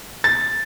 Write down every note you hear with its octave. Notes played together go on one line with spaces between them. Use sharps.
A6